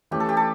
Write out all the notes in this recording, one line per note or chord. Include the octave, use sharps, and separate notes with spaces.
E3 A3 C#4 G4
A4
G4
A4